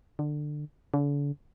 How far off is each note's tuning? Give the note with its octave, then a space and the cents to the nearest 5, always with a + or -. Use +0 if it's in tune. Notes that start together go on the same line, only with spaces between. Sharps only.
D3 +20
D3 -40